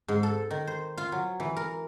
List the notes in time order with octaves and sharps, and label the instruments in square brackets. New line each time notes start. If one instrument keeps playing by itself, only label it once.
[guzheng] G#2
A4
D#3
C5
F4
F#3
E3
A#4